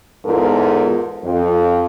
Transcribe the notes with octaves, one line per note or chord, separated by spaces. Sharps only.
E2 G#2 F4 A4 A#4
F2